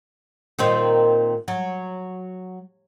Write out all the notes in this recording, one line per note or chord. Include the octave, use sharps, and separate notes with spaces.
A#2 D#3 C4
F#3